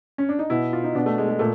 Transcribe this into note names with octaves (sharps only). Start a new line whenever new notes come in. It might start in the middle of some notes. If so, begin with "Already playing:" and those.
C#4
D4
D#4
B2 E4
F4
D#4
B2 D4
A3
G#3
G#3
A#2 A3